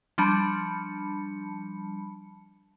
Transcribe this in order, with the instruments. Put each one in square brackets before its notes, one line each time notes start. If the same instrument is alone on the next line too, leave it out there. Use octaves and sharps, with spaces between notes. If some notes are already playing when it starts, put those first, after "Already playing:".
[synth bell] F3 G3 D4 A5 B5 C#7